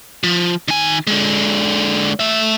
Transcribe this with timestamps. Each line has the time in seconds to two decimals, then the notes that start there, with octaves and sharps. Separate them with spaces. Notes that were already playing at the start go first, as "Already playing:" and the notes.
0.24 F3
0.68 D#3 G#5
1.07 D3 G#3
2.20 A3 E5